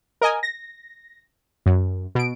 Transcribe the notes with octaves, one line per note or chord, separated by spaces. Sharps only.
A#4 D#5 G#5
A#6
F#2
B2 D7